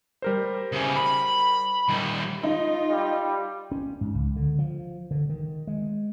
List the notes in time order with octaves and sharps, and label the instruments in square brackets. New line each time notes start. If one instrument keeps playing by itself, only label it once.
[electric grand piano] G3 A#4 C5
[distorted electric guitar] C#3 E4
B5
D#3 G3
[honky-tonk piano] D#4 [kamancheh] F4
[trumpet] G3
[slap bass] C#4
G#2
C#2
D3
F3
D3
D#3
G#3